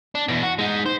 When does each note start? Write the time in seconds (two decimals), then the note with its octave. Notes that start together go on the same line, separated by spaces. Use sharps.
0.15 D4
0.28 B2 E3
0.43 F#4
0.59 G#3 D#4
0.86 C5